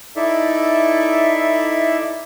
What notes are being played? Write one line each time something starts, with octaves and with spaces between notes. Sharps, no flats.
D#4 E4 A4 D5 E5